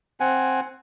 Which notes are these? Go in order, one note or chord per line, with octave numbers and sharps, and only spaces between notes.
C4 F#5 G#5